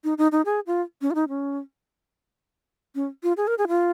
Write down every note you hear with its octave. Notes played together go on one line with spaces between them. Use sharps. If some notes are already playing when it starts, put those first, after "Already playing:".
D#4
D#4
D#4
G#4
F4
C#4
F4
D#4
C#4
C#4
F4
G#4
A#4
G#4
F4